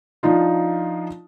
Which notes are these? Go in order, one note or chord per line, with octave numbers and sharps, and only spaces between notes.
F3 D4 D#4 F4